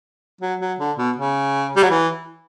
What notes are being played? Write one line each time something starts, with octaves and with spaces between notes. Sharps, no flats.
F#3
F#3
D3
B2
C#3
G3
F#3
E3